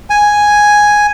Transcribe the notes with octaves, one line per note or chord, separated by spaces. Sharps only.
G#5